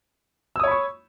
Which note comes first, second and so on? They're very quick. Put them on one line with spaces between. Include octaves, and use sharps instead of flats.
E6 D#6 C#5 B5 C#6